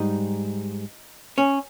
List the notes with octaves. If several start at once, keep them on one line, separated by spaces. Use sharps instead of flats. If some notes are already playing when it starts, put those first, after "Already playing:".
Already playing: G#2 G3 D#4
C#4